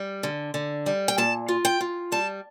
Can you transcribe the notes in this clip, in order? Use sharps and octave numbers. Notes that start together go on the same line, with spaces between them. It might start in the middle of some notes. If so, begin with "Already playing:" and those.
Already playing: G3
D3
D3
G3
G5
A#2 A5
F4
G5
F4
G3 A5